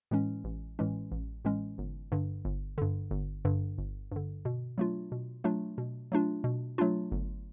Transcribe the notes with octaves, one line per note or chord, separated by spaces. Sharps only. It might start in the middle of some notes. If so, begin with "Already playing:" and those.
A2 E3 G#3 C#4
A1
A2 E3 G#3 C#4
A1
A2 E3 G#3 C#4
G1
G2 D3
G1
G2 D3
G1
G2 D3
G1
G2 D3
B2
F#3 A3 D4 F4
B2
F#3 A3 D4 F4
B2
F#3 A3 D4 F4
B2
F#3 A3 D4 F4
G1